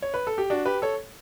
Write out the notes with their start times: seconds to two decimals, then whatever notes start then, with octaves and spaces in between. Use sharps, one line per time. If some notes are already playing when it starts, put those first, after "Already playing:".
0.02 C#5
0.14 B4
0.27 A4
0.38 G4
0.50 D4 F#4
0.66 G4 B4
0.82 A4 C#5